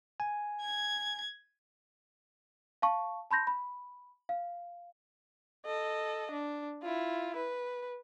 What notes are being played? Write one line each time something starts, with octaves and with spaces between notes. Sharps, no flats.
G#5
G#6
F5 A5 C#6
A5 B5 C6 G6 A#6
B5
F5
A4 D#5
D4
E4 F4
B4